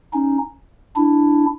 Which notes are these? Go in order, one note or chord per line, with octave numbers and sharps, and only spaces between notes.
C#4 D#4
D4 E4